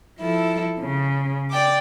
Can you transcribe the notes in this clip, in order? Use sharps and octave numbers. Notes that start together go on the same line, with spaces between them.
F3 E4 A4
C#3
D5 G5 D6